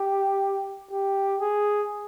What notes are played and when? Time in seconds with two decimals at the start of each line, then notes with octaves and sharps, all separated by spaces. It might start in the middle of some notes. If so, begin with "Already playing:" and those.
Already playing: G4
0.91 G4
1.41 G#4